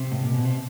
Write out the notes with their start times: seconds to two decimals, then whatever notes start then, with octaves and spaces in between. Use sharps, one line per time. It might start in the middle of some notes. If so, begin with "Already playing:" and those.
Already playing: C3
0.11 A2
0.22 A#2
0.34 B2
0.45 C3